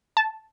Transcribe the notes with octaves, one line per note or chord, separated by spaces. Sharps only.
A5